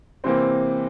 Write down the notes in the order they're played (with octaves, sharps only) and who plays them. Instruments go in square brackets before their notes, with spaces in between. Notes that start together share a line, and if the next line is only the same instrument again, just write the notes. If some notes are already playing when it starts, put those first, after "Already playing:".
[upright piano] C3 E3 A#3 [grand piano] C4 C5